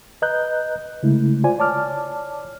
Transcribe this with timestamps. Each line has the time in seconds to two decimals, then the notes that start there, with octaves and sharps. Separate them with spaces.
0.22 B4 D#5 A#5 F#6 G6
1.03 C#3 G#3 A3 E4
1.44 F4 C5 D5 G#5
1.58 C#5 D5 A5 D6 F6